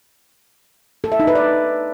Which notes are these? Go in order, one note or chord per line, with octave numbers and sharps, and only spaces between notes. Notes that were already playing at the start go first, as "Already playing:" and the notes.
A4
E5
D#4
B4
D5